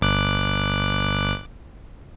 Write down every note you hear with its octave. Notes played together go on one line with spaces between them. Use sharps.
G1 D6 F#6